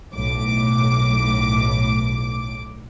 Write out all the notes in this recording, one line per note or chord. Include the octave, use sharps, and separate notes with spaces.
B1 A2 D6